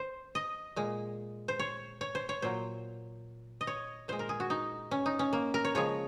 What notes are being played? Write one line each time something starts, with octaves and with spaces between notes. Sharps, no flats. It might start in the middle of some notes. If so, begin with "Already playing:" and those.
Already playing: C5
D#5
A#2 G#3
C5
C#5
C#5
C5
C#5
A#2 F#3 C5
D#5
C#5
A#2 G#3 C5
A#4
G#4
F#4
D#4
C#4
D#4
C#4
A#3
A#4
C#5
C#3 F3 G#3 C#5